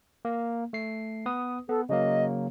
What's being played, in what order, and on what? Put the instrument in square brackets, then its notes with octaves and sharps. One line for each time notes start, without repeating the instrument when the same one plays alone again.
[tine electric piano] A#3
A3 C7
B3 B4 D#6
[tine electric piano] B3 [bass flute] A4
[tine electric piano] C#3 F#3 A#3 [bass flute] D#5